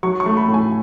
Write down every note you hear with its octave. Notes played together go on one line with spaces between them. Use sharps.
F#3 C#6
C#6
A3
B5
A2
G#5